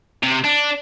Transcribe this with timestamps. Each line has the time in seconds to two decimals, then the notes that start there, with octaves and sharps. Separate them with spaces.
0.23 C3
0.44 D4